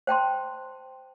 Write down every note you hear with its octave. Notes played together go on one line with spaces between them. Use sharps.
C5 G5 A5 C6